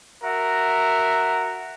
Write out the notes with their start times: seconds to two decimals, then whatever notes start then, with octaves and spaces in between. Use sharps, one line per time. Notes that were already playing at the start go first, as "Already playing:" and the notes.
0.23 F#4 A#4 E5